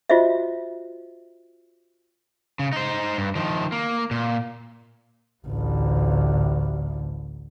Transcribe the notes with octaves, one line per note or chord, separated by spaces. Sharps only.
F4 F#4 C5 D#5 E5
C#3
D#4 C5
G2
D#3 F3
A#3
A#2
A1 D2